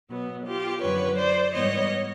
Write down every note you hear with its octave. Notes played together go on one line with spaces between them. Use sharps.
B2 F#3 B3
F4 G4
F#2 D3 F3 B4 C#5
C5 D5
G#2 E3 G3 B3 C#5 D#5